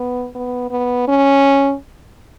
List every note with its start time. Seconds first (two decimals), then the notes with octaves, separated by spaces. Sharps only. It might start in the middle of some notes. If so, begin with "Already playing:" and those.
Already playing: B3
0.35 B3
0.70 B3
1.08 C#4